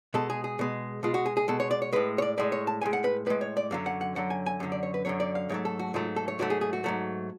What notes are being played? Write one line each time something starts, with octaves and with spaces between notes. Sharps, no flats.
B2 G#3 A4
G#4
G#4
B2 G#3
B2 G#3 F4
F#4
G#4
G#4
B2 G#3 A4
C#5
D5
C#5
A2 G#3 B4
C#5
D5
A2 G#3 D5
C#5
A5
A2 G#3 G#5
F#5
B4
A2 G#3 B4
C#5
D5
F#2 D3 F#3 F5
F#5
F#5
F#2 D3 F#3 F#5
G#5
G#5
F#2 D3 F#3
D5
C#5
B4
F#2 D3 F#3 C#5
D5
F5
G#2 F#3 A3 C#5
A4
F#4
G#2 F#3 A3 F4
A4
C#5
G#2 F#3 A3 F#4
G#4
G#4
F#4
G#2 F#3 A3